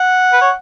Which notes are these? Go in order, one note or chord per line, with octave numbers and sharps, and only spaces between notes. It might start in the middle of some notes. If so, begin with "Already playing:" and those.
Already playing: F#5
B4
C#5